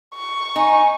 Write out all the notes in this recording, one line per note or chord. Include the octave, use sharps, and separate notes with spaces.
C#6
D#4 G#5